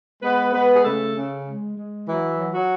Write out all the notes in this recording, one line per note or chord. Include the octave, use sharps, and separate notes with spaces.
G#3 B3 B4
G#3 B3 B4
G#4
C#3 A3 A4
C#3
G#3
G#3
E3 F#3 E4
F#3
F#3 F#4